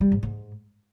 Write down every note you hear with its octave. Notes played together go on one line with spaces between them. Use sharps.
G3
G#2
G#2